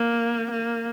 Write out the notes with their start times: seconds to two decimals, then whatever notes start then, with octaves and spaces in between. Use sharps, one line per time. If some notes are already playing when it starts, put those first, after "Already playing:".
Already playing: A#3
0.51 A#3